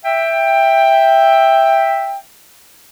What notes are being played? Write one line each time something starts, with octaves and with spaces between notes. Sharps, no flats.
E5 G5